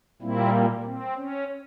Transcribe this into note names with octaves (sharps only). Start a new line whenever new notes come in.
A#2 G3 A#3 C4 E4
C4
C#4